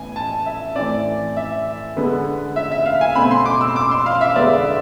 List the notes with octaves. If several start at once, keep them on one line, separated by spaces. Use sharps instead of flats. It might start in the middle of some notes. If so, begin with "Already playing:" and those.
Already playing: A2 E3 B3 G#5
A5
E5
A2 E3 A3 C4 D5
E5
D3 G#3 B3
E5
E5
F5
G#5
B2 A3 C4 B5
C6
D6
E6
D6
C6
F5
E5
D3 G#3 B3 D5
E5